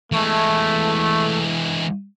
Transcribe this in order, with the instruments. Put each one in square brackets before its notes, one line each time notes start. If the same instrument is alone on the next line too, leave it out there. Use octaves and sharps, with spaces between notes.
[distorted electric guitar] E3 G#3 [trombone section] A3